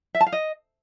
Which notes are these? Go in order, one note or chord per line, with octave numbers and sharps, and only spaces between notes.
E5
A5
F5
D#5